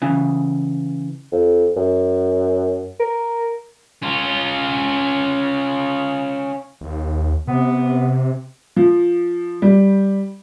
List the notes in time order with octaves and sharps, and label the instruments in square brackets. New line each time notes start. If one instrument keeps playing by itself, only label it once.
[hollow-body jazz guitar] C#3 E3
[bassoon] F2
F#2
A#4
[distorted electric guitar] C#4 F4
[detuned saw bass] D#2
[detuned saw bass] C3 [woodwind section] B3
[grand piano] F3
G3